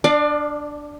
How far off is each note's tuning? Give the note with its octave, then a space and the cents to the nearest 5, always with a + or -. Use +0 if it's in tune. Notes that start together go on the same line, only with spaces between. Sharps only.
D4 +0 D5 +30 F5 +0